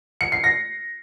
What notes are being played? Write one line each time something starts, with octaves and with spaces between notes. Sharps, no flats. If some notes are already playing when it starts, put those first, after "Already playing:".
C#7
C7
A#6